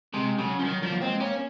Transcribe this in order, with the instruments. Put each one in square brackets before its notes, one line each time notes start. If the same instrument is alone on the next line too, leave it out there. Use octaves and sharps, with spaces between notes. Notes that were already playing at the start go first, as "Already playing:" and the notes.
[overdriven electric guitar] C3 [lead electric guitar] G#3
[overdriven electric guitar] C#3 [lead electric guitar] F#3
[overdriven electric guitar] F3
[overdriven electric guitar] D#3 [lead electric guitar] F#3
[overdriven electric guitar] F3 [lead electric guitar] F#3
[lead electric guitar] A#3
[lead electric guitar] G#3 [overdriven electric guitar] C4
[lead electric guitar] A#3 [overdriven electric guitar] C#4